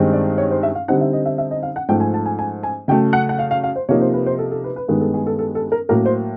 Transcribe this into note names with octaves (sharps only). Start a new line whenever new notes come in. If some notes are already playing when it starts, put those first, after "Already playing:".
Already playing: G2 D#3 G#3 C4 D#4
D5
C#5
C5
E5
F5
D3 G3 C4 D#4 F#5
E5
D#5
E5
E5
D#5
F5
F#5
G#2 F3 A3 G5
G#5
A5
G#5
G#5
G#5
C#3 F#3 A3 G5
F#5
F#5
F5
F5
F5
C5
C3 F3 A#3 D#4 C#5
C5
B4
C5
A4
A4
B4
B4
G2 D#3 G#3 B3 A#4
A4
G#4
A4
A4
A4
A#4
A2 F#3 A#3 A#4
C5